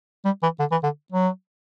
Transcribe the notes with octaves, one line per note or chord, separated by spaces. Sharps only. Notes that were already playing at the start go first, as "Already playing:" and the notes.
G3
E3
D3
E3
D3
F#3